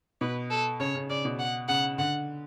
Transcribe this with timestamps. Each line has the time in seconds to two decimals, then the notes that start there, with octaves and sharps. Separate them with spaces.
0.21 B2 B4
0.50 A4
0.80 C#3 C#5
0.95 C#3
1.10 C#3 D5
1.25 B2
1.39 F#5
1.68 C#3 F#5
1.98 D3 F#5